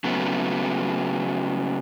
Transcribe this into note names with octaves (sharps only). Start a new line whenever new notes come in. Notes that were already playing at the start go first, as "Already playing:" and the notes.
C#3 F#3 A3 B3